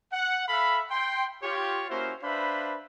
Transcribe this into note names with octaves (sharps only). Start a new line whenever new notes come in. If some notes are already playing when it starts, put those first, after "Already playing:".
F#5
A4 E5 F5 B5
G5 C6
F4 G4 C#5
A#3 C#4 E4 F#4 C5
D4 B4 C5 E5 F5 B5